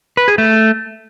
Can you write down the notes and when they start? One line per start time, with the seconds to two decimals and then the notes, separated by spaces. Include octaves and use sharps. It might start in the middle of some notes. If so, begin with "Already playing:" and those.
0.17 B4
0.28 G#4
0.38 A3